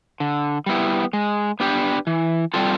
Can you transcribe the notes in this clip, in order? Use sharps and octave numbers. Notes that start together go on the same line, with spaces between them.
D3
G3 B3 E4
G#3
B3 D4 G4 B4
E3
G3 C4 F4 A4